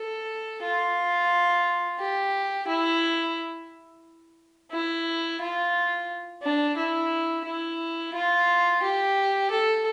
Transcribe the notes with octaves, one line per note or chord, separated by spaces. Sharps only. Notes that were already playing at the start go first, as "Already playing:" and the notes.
Already playing: A4
F4
G4
E4
E4
F4
D4
E4
E4
F4
G4
A4